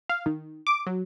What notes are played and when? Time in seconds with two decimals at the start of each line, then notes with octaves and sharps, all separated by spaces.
0.09 F5
0.26 D#3
0.67 D6
0.86 F#3